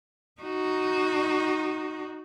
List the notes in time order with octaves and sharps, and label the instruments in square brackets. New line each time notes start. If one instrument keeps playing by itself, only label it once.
[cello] D#4 F#4